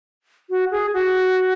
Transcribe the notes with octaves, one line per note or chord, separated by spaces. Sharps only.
F#4
G#4
F#4